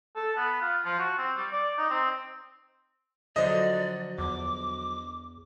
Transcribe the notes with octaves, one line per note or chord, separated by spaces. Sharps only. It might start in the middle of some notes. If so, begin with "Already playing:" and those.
A4
B3
F4
F3
F#4
C4
G3
D5
D#4
C4
D3 F3 F#3 D5 D#5
E2 D6